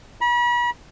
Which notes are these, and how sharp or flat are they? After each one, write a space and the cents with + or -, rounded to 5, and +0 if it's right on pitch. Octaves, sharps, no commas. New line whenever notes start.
B5 -40